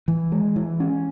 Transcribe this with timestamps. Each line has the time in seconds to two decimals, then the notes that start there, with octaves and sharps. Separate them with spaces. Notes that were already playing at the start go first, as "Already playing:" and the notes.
0.08 E3
0.32 G#3
0.56 E3
0.80 C#4